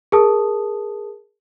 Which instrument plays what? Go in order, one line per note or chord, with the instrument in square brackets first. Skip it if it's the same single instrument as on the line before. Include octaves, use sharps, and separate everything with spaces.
[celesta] G#4 A#4 A5 D#6